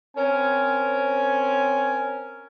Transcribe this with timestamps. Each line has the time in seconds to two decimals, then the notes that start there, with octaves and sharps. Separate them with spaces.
0.16 C4 C#4 A#4 G#5